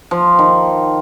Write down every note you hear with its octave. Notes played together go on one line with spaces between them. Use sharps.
F3
D#3